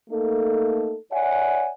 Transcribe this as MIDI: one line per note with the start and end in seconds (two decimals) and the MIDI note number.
0.10 0.95 57
0.10 0.95 58
0.10 0.95 63
0.10 0.95 69
1.12 1.70 73
1.12 1.70 74
1.12 1.70 76
1.12 1.70 78
1.12 1.70 80